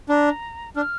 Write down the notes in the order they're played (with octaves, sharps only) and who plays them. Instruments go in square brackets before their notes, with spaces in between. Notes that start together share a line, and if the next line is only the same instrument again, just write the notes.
[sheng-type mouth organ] D4 [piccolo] A#5
[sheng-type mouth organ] D4 [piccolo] F6